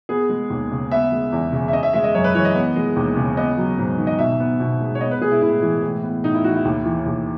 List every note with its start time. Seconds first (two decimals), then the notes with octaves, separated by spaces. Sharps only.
0.09 B3 G#4
0.29 G#3
0.50 D#2
0.71 C#3
0.91 B3 E5
1.12 G#3
1.32 E2
1.52 C#3
1.68 E5
1.73 C#4 D#5
1.83 E5
1.93 G#3 E5
2.04 D#5
2.14 F#2 C#5
2.24 B4
2.34 E3 C#5
2.45 D#5
2.55 B3
2.76 G#3
2.96 D#2
3.17 C#3
3.37 B3 D#5
3.58 F#3
3.78 G#2
3.98 D#3
4.07 D#5
4.19 B2 E5
4.40 B3
4.60 B2
4.80 G#3
4.95 C#5
5.01 B3 D#5
5.11 B4
5.21 G#3 G#4
5.32 E4
5.42 A2 E4
5.62 E3
5.83 A2
6.03 B3
6.24 A2 D#4
6.34 E4
6.44 E3 F#4
6.55 E4
6.65 D#2
6.85 E3
7.06 D#2